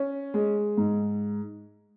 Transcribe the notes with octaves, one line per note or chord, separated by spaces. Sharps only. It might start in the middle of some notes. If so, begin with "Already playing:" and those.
Already playing: C#4
G#3
G#2